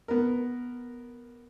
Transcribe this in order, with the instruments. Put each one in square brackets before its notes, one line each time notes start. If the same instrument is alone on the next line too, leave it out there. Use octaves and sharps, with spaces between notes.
[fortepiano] B3 A#4